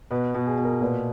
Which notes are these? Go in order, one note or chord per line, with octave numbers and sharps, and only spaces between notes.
B2 B4
B2
G#4
B2
A#4
A#2 B4